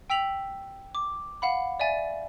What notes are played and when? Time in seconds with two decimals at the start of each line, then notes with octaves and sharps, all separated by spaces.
0.10 G5 E6 B6 F7 F#7
0.95 D6
1.42 F5 F#5 B5
1.80 D5 E5 G#5 A6